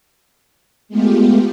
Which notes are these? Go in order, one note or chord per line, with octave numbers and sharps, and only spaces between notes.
G#3 A3 B3 F4 G4